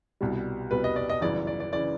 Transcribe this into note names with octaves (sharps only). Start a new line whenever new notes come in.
C2 B2 G3
C2 B2 G3 B4
D#5
D5
D#5
G1 F#2 C#3 E3 D5
D5
D5
C#3 E3 D5